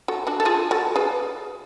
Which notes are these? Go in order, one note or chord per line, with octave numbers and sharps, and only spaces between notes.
F#4 A4
D4 F#4
A4
F4 G#4
F#4 A4
G#4 B4